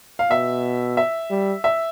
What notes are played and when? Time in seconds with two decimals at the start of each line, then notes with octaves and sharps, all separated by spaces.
0.19 F5
0.31 B2 E5
0.97 E5
1.30 G3
1.64 E5